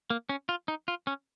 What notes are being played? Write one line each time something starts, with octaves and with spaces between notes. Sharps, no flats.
A#3
C#4
F4
D#4
F4
C#4